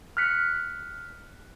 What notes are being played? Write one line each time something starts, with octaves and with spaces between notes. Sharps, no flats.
F6 F#6 B6 C#7